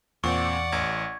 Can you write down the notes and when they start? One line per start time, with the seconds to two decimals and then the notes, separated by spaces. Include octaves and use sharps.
0.24 E2 A#2 C4 D5 F#5 C#6
0.72 A1 G#6